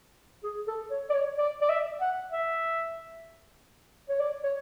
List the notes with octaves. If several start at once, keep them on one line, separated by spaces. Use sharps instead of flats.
G#4
A4
C#5
D5
C#5
D5
D5
E5
F#5
E5
C#5
D5
C#5